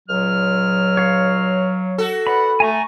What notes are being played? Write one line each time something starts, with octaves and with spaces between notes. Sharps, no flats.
C#2 A#2 F#3 F6
C#5 F5
F#4 A4
B4 D5 F#5 B5
A3 G#5 A#5 C#6